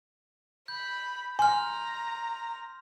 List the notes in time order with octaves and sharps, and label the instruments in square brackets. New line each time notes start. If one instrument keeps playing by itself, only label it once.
[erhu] B5 [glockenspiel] G6
[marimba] G#5 [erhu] A#5 [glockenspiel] C6 F6